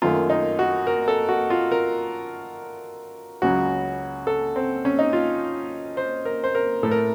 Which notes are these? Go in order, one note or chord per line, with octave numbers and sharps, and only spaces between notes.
F#2 D#3 A3 F4
D#4
F#4
A#4
A4
F#4
F4
A#4
C#2 C#3 F#3 F#4
A4
C4
C#4
D#4
F4
C5
A#4
C5
A#4
A2 A3 A4
A#4